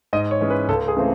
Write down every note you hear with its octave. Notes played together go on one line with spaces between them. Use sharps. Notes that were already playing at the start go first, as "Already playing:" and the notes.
G#2 D#5
C#5
E3 G#3 C#4
B4
C#2 A4
G#4
C#3 E3 A3 C4